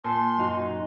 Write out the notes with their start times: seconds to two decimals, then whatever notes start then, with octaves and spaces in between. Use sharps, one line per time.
0.04 A#2 A5 C6
0.38 F#2 D#4 F#4